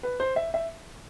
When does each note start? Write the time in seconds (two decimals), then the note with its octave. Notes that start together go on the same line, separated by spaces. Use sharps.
0.03 B4
0.20 C5
0.36 E5
0.54 E5